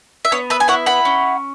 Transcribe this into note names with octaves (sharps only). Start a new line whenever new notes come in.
E5
B3 C#5
B4 E5
G#5
E4 C#5 F#5
F#5 B5
C#4